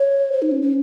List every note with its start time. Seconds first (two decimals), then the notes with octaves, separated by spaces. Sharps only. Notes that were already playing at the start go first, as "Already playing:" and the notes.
Already playing: C#5
0.32 C5
0.42 D#4
0.52 C#4
0.62 C#4